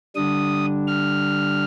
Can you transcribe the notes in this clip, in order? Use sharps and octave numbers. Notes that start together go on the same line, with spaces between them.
D3 G3 D4 D#6
F6